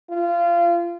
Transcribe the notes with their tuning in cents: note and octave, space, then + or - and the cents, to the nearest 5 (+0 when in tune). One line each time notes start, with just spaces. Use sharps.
F4 -25